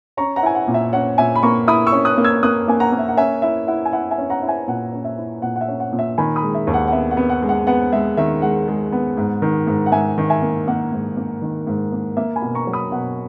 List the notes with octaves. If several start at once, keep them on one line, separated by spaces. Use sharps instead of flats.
C#4 A#5 C#6
F#5 A#5
E4 G#5
F#5
A#2
E5
C#4 F#5
A#2 E5 G#5
B5
A#3 A#5 C#6
E4 B5 D#6
C#6 E6
C#4
D#6 F#6
A#3
E6 G#6
A#3 D#6 F#6
A#3 G#5
F#5 A#5
A#3
E5
F#5
C#4 E5 G#5
E4 E5
E4 F#5
G#5
E4 F#5
E5 G#5
C#4
F#5 A#5
E4
E5 G#5
A#2 F#5
C#4
E5
E4
A#2 F#5
F#5
E5
C#4
F#5
A#2
E5
D#3 G#5 B5
B5 D#6
G#3
E5
D#2
F#5
F#5
B3 E5
F#5
B3
F#5
G#3
F#5
B3 F#5
G#3 E5
D#3 E5
G#3 F#5
G#3
B3
G#2
D#3
G#2
F#5
G#2 E5 G#5
D#3
E5 G#5
A#3
A#3 F#5
G#2
A#3
D#3
G#2
A#3
A#3 E5
G#5 B5
B2
A#5 C#6
F#3
B5 D#6
B2 F#5